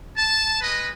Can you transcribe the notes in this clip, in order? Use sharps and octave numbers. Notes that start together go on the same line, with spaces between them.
A5
G#3 B4 D#5